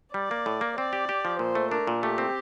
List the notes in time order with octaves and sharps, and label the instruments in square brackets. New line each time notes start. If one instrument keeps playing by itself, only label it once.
[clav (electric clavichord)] G3 [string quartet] D5
[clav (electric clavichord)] A#3
A2
A#3
[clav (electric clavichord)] C4 [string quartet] D5
[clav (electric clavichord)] G4
G4
F3
[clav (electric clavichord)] A#2 [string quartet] C5
[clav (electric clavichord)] A3
[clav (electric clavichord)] D4 [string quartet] A#4
[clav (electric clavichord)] A#2
[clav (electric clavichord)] A3 [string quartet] G4
[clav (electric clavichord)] C4